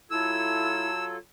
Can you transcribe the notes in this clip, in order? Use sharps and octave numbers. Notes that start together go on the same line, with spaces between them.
F#3 E4 F4 A4 E6 G#6